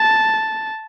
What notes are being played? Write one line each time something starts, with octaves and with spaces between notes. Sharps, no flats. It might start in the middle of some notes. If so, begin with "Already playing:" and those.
Already playing: A5